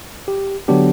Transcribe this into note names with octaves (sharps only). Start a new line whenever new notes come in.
G4
D3 F#3 B3 D4 G4